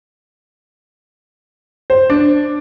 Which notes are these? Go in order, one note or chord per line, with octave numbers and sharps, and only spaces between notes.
C5
D4